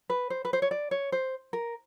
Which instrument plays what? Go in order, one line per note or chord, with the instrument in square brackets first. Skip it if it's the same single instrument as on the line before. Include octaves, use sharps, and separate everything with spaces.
[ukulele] B4
C5
B4
C5
C#5
D5
C#5
C5
A#4